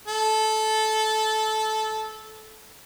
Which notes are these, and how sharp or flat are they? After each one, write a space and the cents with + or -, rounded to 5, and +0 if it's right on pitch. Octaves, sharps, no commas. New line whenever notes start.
A4 -15